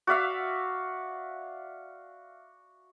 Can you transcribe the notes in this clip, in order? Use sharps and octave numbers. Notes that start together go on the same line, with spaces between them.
F#4 D5 E5 F5